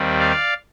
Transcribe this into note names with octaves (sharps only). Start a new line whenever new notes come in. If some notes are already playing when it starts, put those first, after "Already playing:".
Already playing: D#2 D#3 G3 C4
D5 F5